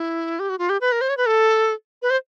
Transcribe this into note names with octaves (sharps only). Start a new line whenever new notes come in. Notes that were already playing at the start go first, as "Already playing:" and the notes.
Already playing: E4
G4
F#4
F4
G4
B4
A#4
C5
C#5
B4
A4
B4
C5